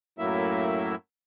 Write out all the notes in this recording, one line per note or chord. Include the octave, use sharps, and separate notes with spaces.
F#2 A2 F#3 A#3 E4 E5